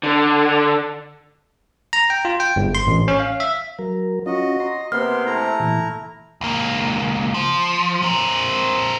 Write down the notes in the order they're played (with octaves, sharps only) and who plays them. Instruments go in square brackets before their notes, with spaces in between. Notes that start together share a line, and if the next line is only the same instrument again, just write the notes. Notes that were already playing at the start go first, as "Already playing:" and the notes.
[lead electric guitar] D3
[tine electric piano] A#5
G5
F4
G5
G1
C6
A1
C#4
F5
E5
[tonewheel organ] F#3 A#4
[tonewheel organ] C#4 F4 [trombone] F#4 [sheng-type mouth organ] D#5
[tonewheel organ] A#5 C6
[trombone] C3 [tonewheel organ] A#3 [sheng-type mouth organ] B3 C6 [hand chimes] F6
[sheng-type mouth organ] A3 E4 A#5
[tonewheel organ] A#2 E3
[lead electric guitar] C#2 A#3
F3
C4 A#4